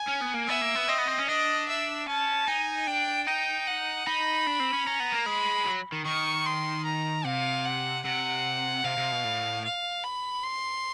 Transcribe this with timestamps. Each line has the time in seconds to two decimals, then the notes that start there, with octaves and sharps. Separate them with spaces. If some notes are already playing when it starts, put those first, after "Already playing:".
Already playing: G#5
0.08 C#4
0.22 B3
0.35 A#3
0.48 B3 E5
0.62 A#3
0.75 B3
0.88 C4 D#5
0.98 B3
1.08 C4
1.19 C#4
1.28 D4 D#5
1.68 E5
2.07 C#4 A5
2.48 D#4 G#5
2.87 D4 G5
3.27 D#4 G5
3.67 F#5
4.06 D#4 B5
4.47 D4
4.60 C4
4.73 C#4
4.87 C#4 A#5
5.00 B3
5.12 A#3
5.26 G#3 B5
5.66 F#3
5.92 D#3
6.05 D#3 C#6
6.46 C6
6.85 A#5
7.25 C3 F5
7.65 F#5
8.05 C3 F#5
8.84 C3 F5
8.97 C3
9.12 B2
9.24 A2
9.64 F5
10.04 B5
10.44 C6